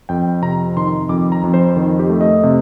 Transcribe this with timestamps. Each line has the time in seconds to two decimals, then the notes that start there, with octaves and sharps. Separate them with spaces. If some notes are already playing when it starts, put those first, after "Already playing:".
0.09 F2 G5
0.42 C3 A#5
0.77 D#3 C6
1.09 F2 D6
1.32 A#5
1.44 F2
1.54 C5
1.76 D#3
1.99 G4
2.10 A3
2.21 D#5
2.43 C3